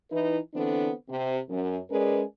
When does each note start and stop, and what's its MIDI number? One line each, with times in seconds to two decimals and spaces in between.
0.11 0.37 52
0.11 0.37 63
0.11 0.37 64
0.11 0.37 71
0.54 0.90 50
0.54 0.90 52
0.54 0.90 59
0.54 0.90 60
0.54 0.90 62
0.54 0.90 69
1.09 1.37 48
1.50 1.78 42
1.90 2.22 56
1.90 2.22 61
1.90 2.22 68
1.90 2.22 70
1.90 2.22 71
1.90 2.22 74